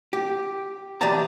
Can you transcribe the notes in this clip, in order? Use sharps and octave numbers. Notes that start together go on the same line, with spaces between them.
G4
E3 G4 D5 D#5 A5 A#5